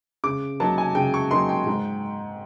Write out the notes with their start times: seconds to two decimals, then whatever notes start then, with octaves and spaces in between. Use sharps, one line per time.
0.24 C#3 D6
0.60 F#3 A#3 D#4 A5
0.78 G#5
0.95 C#3 G5
1.14 C#6
1.31 F#3 A#3 D#4 C6
1.49 G5
1.67 G#2